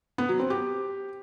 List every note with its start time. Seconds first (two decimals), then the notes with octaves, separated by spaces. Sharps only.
0.18 B3
0.29 F#3
0.40 C4
0.50 G4